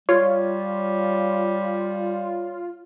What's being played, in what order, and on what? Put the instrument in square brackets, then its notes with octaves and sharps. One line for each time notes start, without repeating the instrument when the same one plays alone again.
[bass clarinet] G3 [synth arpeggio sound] F4 [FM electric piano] C#5